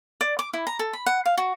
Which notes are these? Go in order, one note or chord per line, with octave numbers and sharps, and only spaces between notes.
D5
D6
E4
A#5
A4
B5
F#5
F5
F#4